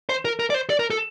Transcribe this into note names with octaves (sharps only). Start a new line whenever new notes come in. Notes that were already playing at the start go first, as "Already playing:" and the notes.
C5
A#4
A#4
D5
C5
D5
A#4
A4